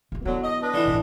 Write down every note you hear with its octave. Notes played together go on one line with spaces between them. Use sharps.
D2 C#3
D3 F#3 B3 E4
D#5
D4 B4 D#5
D3 E3
A1 C3